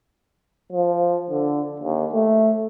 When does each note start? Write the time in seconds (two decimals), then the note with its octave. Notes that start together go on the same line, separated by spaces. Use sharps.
0.72 F3
1.30 D3
1.80 D#2
2.13 A3